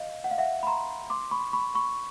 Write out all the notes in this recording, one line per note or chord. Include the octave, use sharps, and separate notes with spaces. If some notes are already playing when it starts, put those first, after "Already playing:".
Already playing: D#5 F5
F#5
F5
E5 F#5
B5
A#5 C6
C6 D6
B5 C#6
B5 C#6
B5 C#6